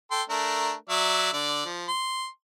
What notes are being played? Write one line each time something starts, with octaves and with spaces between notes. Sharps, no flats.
A4 G5 C6
A3 D4 A#4
F#3 D5 E5
D3 D5
F3
C6